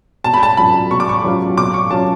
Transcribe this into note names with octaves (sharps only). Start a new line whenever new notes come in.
B2 A5
B5
A5
F#3 C#4 F4 B5
B2 C#6
D6
C#6
F#3 C#4 F4
B2 D6
C#6
F#3 C#4 F4 A5